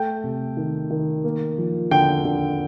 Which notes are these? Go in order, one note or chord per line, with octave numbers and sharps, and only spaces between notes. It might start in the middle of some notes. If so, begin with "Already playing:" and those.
Already playing: A3 G5
C3
D#3
D#3
A#3
F3
D3 G5
D3